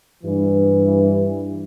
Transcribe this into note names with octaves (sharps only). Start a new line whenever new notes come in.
G2 E3